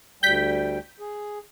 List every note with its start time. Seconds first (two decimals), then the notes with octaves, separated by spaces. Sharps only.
0.23 D2 G3 G5 G6 B6
1.00 G#4